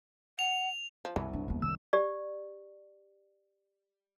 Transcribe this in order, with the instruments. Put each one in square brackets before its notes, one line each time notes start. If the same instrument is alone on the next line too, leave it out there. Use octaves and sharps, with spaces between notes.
[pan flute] F#5 [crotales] F7
[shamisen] F3
[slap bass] C2 F#2 B2 [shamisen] E3
[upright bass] D4
D#2 B3
[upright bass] D#3 [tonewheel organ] E6
[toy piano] G4 D5